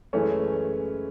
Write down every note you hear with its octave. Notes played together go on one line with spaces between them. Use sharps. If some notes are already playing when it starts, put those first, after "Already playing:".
F#2 E3 G#3 A3 C#4